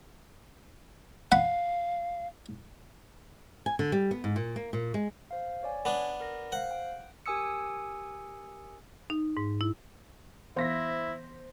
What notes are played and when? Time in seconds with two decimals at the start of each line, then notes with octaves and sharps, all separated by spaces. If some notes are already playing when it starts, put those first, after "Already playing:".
1.32 F5 F#5 B5
3.66 G#5
3.79 D3
3.92 G3
4.11 B3
4.24 G#2
4.36 A#2
4.56 A#3
4.73 A#2
4.94 G#3
5.31 C5 F5
5.63 C#5 D5 G#5
5.85 B3 D4
6.20 A#4 A#6
6.52 C5 F5 F#5
6.71 G5
7.26 G4 A#4 G#5 D#6 E6 C#7
9.10 D#4
9.37 G#2
9.61 E4
10.56 E3 B3 E4 C5 F5 A#6 B6